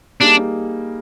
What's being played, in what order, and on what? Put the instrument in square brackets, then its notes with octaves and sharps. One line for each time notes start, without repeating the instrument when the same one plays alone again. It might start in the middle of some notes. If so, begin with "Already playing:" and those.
[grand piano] G3 A#3 D#4 G#4 [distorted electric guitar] D4